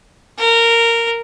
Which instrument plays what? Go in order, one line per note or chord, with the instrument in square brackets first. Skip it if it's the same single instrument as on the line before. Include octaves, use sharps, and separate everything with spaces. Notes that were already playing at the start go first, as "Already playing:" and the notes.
[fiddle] A#4